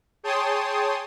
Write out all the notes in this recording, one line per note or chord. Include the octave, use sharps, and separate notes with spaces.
G#4 C#5 G5 A5 C6 D#6